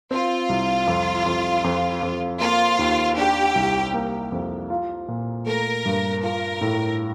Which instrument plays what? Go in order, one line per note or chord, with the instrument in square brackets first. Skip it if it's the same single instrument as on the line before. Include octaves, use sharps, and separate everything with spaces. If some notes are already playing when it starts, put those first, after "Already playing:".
[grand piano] C4 [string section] F4
[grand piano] C2
F2
F2
F2
F2
[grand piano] A#3 [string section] F4
[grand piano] D#2
[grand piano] D4 [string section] G4
[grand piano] C2
A#3
F2
F4
A#2
[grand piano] A3 [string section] A#4
[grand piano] G2
[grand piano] F4 [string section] A#4
[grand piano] A2